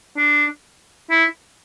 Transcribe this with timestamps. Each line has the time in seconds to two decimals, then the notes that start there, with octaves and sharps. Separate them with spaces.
0.17 D4
1.10 E4